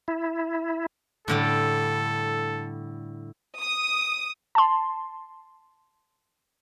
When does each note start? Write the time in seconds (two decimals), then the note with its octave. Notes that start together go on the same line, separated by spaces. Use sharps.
0.08 E4
1.28 A2 D3 G3 A4
3.59 D#6
4.55 A5 C6